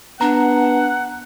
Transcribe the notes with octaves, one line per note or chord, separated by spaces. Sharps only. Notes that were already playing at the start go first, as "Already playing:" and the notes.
B3 D4 F#5 A#5